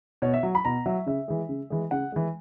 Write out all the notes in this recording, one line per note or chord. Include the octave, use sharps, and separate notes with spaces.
B2 C#5
E5
F#3
B5
B2 A#5
F#3 E5
C#3 E5
E3 G#3
C#3
E3 G#3
C#3 F#5
E3 G#3